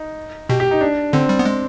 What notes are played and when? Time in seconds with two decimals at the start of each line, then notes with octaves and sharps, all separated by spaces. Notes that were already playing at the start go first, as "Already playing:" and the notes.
Already playing: D#4
0.49 B2 G4
0.60 G4
0.71 D#4
0.81 D4
1.13 D3 C4
1.29 G3
1.39 B3
1.45 G#3